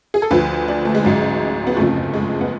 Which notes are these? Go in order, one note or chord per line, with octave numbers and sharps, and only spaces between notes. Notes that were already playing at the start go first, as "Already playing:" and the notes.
G#4
A4
D2 D3 F3 B4
D4
A3
G#3
A1 G#2 F#3
B3
F#1 F2 C#3 F3 A3
G#3
B3